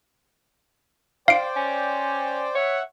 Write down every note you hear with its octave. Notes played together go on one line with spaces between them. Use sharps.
C5 D5 F5 G5 D7
C#4
C#5 E5 F#5